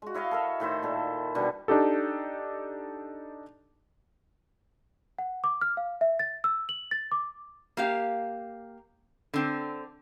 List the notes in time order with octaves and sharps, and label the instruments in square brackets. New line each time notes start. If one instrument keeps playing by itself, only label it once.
[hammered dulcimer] G#3 F#4
E4 C#5 D#5 F5
A4 A#4 E5
A2 D#3 E4 C5
A#2 A4
B2 D3 G3 B3
[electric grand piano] D4 D#4 G4 A4
[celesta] F#5
D6
F6
F5
E5
A6
E6
F#7
A6
D6
[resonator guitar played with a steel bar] A#3 G4 F5
D3 C4